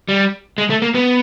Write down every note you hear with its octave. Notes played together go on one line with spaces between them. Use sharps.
G3
G#3
A3
A#3
B3